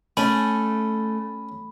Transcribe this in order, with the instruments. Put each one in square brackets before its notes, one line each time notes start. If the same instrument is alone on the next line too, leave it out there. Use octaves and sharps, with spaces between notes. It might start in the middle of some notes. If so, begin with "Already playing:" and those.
[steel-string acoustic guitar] A3 [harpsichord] C#4 G#5 [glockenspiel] B5